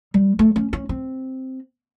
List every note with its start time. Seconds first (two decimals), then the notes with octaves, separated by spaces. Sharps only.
0.14 G3
0.39 A3
0.56 C#4
0.73 C#4
0.89 C4